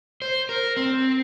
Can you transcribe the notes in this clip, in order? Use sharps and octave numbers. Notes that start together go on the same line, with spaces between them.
C5
A#4
C4